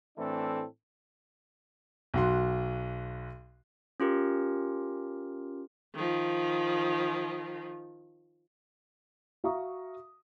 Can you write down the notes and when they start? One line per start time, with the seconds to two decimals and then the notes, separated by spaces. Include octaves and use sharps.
0.17 A2 E3 A3 C4 D4 A4
2.14 B1 F#4 C6
4.00 C#4 F4 G4 A#4
5.94 D#3 F3
9.44 F#4 E5 F5 A#5 C#6 D#6